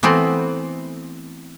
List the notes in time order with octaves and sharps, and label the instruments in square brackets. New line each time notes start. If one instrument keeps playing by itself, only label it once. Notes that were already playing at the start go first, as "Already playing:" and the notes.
[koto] E3 A3 B3 C4 F#4